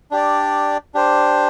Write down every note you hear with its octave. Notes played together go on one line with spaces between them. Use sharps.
D4 G4 D5
D4 G4 C5